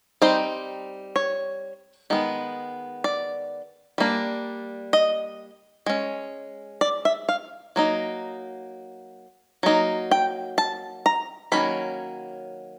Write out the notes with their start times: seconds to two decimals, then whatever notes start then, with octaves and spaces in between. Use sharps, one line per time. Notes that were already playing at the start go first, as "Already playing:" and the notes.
0.22 G3 C4 D#4 C5
1.16 C#5
2.10 D#3 G#3 B3
3.04 D5
3.98 G3 A#3 D4
4.93 D#5
5.86 G#3 C#4
6.81 D5
7.05 E5
7.29 F5
7.76 F#3 A#3 D#4
9.63 F#3 A#3 D#4
10.11 G5
10.58 A5
11.06 A#5
11.52 D#3 F#3 A#3 C#4 B5